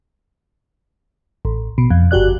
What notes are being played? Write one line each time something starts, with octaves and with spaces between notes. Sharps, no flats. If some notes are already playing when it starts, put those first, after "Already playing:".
A1
B2
F2
G1 F#4 G4 D5 F#6